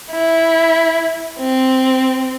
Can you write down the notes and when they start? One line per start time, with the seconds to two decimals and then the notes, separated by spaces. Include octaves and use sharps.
0.11 E4
1.39 C4